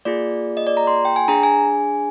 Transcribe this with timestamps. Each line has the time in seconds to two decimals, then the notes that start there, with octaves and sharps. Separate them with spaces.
0.05 A#3 F4 G#4 D5
0.57 D#5
0.67 D5
0.77 A#5
0.87 C6
1.05 G5
1.16 G#5
1.28 D4 G#4 A#5
1.43 G#5